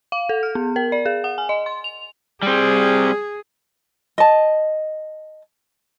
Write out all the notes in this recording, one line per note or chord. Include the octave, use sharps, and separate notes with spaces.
F5
A4
F6
B3
A#4
D5
G#4
F#5
G#5
D#5
C6
F7
G3 C4 G#4
D#5 A5